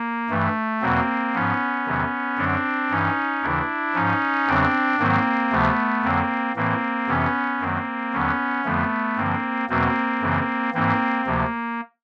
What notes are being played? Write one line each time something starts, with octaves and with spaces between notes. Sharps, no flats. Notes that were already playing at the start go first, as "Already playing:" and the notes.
Already playing: A#3
G2 E3 A3
E2 B2 F#3 A#3 C4
G#2 F3 B3 C#4
E2 C3 D#3 F#3
F#2 D3 F#3 C4 D4
G2 E3 C#4 D#4
D#2 C#3 E3 D4 E4
G#2 F3 C#4 D#4
E2 C#3 F#3 C4 D4
G#2 D#3 F#3 A#3 C4
D2 C3 F3 A3 B3
F2 D3 F#3 A#3 C4
A2 E3 A#3 C4
F2 C3 E3 B3 C#4
F#2 D#3 F#3 A#3 C4
D#2 D3 F#3 B3 C#4
F2 D3 F3 A3 B3
G2 D3 F3 A#3 C4
E2 B2 F#3 A#3 C4
F#2 C#3 E3
G#2 E3 A#3 C4
D2 C3 F3 A#3